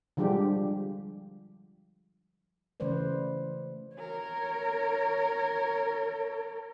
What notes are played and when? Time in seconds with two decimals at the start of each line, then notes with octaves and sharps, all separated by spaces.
0.17 D3 F3 G3 G#3 G4
2.80 C#3 E3 A3 B4 C5 D5
3.96 A#4 C#5